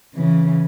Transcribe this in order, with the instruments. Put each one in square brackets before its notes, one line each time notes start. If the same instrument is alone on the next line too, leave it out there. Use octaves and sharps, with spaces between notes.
[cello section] C#3 E3